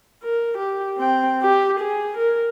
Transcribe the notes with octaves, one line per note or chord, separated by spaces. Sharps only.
A#4
G4
C4 G5
G4
G#4
A#4